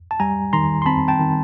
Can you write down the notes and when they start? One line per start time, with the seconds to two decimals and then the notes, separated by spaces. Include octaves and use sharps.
0.11 A5
0.20 G3 G#5 A#5
0.53 D#3 A#5 C6
0.82 C6
0.86 C4 A5 B5
1.08 G5 A5
1.19 D#3